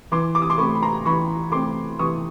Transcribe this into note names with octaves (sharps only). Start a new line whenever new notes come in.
E3 C6 D6
D6
D#6
C6 D6
A3 C4 B5 C#6
B5
A#5 C6
E3 B5 C#6
A3 C4 C6 D6
E3 C#6 D#6